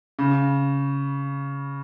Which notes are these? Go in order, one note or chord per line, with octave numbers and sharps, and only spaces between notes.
C#3